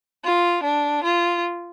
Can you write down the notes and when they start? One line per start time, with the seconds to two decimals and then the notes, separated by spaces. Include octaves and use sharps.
0.23 F4
0.63 D4
1.03 F4